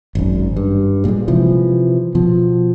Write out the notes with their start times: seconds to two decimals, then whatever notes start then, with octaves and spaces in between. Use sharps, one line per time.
0.15 G#1 F#2
0.56 G2
1.05 A#2 G3 G#3
1.28 C3 E3 F3
2.15 B2 F3